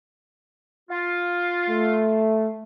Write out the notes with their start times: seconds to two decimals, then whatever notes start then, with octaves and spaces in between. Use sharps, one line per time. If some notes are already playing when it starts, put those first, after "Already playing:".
0.90 F4
1.68 A3